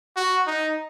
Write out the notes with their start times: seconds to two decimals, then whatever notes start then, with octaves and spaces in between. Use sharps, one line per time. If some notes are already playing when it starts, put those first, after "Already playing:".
0.17 F#4
0.47 D#4